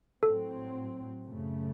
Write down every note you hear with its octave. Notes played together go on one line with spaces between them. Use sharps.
A2 F#3 C4 A4
F#2 C#3 A3